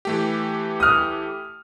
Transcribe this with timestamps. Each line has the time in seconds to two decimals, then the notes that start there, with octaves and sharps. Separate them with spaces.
0.05 E3 A3 G4
0.80 D#6 F6